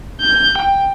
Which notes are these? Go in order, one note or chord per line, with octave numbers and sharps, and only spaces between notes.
G6
G5